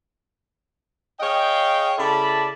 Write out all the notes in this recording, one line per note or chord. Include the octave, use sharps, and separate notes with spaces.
G#4 C#5 D#5 F5 G5
C#3 E4 A4 D5 A5 B5